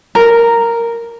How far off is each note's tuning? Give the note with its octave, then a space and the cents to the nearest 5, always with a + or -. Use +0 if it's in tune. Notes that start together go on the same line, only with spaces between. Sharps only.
A#4 -5